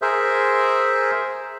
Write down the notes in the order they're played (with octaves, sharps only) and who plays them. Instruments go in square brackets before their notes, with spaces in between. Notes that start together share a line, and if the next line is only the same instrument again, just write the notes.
[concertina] G#4 A#4 C5 E5